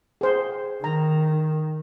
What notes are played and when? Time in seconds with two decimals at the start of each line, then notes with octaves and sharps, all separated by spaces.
0.21 G#4 C5
0.84 D#3 A#5